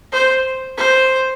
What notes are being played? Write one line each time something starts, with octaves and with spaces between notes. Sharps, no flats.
C5
C5